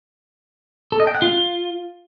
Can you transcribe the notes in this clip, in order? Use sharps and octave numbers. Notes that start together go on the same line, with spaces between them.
A4
D#5
G5
F#5
F4